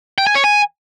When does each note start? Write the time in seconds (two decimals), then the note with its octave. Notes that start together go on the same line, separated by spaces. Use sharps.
0.18 G5
0.27 G#5
0.35 C#5
0.44 G#5